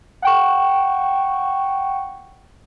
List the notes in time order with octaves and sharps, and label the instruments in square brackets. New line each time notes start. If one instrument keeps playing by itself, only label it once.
[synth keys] F#5 G5 C#6